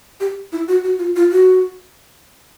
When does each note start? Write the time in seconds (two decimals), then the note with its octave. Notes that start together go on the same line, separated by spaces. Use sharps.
0.20 G4
0.52 E4
0.68 F#4
0.84 F#4
0.99 F4
1.16 F4
1.32 F#4